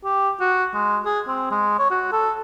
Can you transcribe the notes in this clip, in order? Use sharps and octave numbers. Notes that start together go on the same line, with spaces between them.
G4
F#4
G#3
G#4
C4
G#3
C#5
F#4
A4